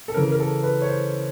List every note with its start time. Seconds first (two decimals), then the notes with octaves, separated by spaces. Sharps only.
0.08 A4
0.14 C#3 E3 A#4
0.32 A#4
0.40 A4
0.63 B4
0.82 C#5
0.89 C5